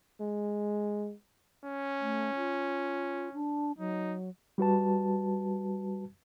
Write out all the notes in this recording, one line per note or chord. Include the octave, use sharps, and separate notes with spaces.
G#3
C#4
A3
F4
D4
F#3 D#4
G3 F#4 B4 A5